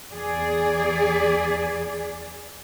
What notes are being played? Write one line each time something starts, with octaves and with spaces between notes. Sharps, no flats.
E2 G#4 D5